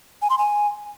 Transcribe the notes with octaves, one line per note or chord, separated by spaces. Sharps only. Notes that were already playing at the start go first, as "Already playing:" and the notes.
G#5
C6
G#5